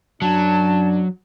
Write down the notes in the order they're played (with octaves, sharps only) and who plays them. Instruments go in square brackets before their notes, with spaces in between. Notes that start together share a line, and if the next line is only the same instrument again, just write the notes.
[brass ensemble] F#2 D4 [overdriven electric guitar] F#3 [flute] A5